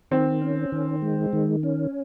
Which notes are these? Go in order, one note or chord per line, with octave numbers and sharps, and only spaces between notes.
D#3 C4
C#4
D#3
G#3
D#3
C#4